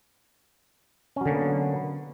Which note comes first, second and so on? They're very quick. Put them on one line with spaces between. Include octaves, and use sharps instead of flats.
C#4 F#3 D3 A#3 B3